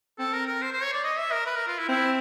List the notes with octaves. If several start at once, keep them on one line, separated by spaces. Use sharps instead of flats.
C4 A4
A#4
A#4
C5
C5
C#5
D5
D#5
E5
A#4
B4
A#4
F4
E4
C4 E4